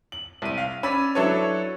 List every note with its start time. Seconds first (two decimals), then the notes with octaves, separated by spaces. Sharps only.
0.12 F#7
0.42 C2 D#7
0.58 F5
0.83 C#4 D5 B5 E6 B6 D#7
1.15 F#3 D4 E4 A4 B4 C#5